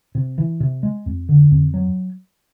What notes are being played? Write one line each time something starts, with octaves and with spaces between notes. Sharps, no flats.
C3
E3
C3
G#3
F2
D3
F2
F#3